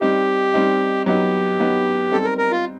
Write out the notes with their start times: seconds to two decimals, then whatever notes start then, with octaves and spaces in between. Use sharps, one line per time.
0.01 G3 C4 D#4 G4
0.54 G3 C4 D#4
1.06 F#3 B3 D#4 G4
1.60 F#3 B3 D#4
2.11 G3 C4 D#4 A4
2.25 A#4
2.38 A#4
2.51 F4